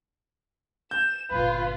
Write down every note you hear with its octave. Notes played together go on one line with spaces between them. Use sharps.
G6 E7
G1 A#2 F4 B4